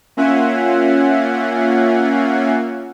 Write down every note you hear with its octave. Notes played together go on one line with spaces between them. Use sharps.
A#3 C#4 F4 E5 F#5 G#5